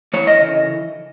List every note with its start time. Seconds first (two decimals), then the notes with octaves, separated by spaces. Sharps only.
0.14 E3 C#5
0.27 D#5
0.41 C#3